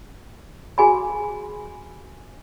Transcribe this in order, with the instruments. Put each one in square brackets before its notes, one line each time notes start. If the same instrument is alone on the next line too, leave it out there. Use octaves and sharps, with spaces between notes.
[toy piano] F#4 G#4 G#5 B5